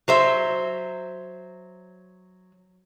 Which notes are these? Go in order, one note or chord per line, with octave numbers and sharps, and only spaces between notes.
F#3 C5 E5